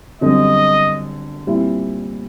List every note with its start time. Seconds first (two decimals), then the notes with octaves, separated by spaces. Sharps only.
0.21 G1 F#2 D3 G3 C4 D#5
1.47 A#2 G3 C4 E4